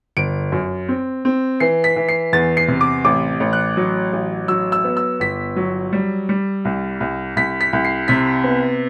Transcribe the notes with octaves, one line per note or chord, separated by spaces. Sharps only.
G1 D7
F#2
C4
C4
E3 C7
B6
E3
C7
E2 A6
C7
C3
D6
A1 D6
A1
F#6
F#3
A1
F#3 E6
E6
B3
E6
G1 B6
F#3
G3
G3
C2
C2
C2 B6
B6
C2
C7
C3 B6
B3